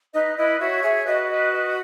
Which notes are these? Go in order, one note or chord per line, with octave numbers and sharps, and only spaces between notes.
D#4 B4 D#5
E4 B4 D#5
F#4 C#5 E5
G#4 C#5 E5
F#4 B4 D#5
B4 D#5
B4 D#5